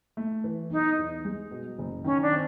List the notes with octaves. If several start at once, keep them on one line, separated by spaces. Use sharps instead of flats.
A3
E3
B1 D#4
E2
G#3
B2
F#1
D#3 C#4
D4
C4